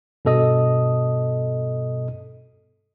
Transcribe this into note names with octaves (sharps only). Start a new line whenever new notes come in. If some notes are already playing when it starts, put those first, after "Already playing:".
G2 B2 A4 D#5 D#6